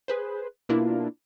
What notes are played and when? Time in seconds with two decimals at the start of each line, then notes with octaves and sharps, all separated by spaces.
0.08 G#4 B4 C5
0.69 B2 A#3 D4 E4 F4